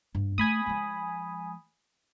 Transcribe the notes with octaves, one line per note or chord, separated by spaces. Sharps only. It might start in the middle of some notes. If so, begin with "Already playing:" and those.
G2
A3 G#5 B5 D#6
F3 G#3